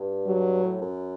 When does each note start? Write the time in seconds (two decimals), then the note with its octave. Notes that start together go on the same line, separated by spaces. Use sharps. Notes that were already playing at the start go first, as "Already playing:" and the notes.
Already playing: G2
0.27 F#3
0.63 A2
0.81 F#2